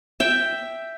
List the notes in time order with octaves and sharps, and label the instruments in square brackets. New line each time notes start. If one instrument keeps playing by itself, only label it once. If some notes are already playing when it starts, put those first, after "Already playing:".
[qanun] E5 G5